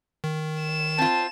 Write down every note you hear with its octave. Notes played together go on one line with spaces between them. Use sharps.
D#3
E7
C4 F4 A5